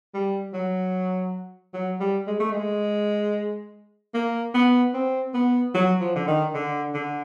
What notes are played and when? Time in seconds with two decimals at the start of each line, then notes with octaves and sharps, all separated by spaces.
0.14 G3
0.53 F#3
1.74 F#3
2.00 G3
2.27 G#3
2.40 A3
2.52 G#3
4.14 A#3
4.54 B3
4.94 C4
5.34 B3
5.74 F#3
6.01 F3
6.15 D3
6.27 D#3
6.54 D3
6.94 D3